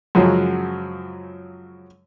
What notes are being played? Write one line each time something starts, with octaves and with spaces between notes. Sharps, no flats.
F#2 C#3 F3 F#3 G#3